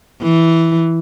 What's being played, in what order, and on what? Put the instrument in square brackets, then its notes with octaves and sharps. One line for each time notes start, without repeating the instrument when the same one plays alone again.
[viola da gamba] E3